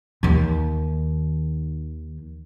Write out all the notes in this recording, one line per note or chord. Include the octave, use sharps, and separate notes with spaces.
D#2 D#3